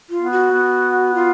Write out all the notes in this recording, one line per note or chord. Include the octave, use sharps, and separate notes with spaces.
F4
B3
F#4
B3
F4